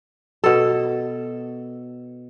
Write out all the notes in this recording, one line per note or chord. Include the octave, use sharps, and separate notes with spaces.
B2 A4